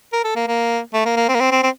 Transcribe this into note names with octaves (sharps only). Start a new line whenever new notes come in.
A#4
A4
A#3
A#3
A3
A#3
A#3
C4
A#3
C4
C4
C4